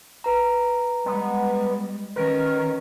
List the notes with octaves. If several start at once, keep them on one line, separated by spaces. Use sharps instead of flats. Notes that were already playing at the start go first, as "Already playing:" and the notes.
B4 A#5
G3 G#3 B3
D#3 C#4 A#4 B4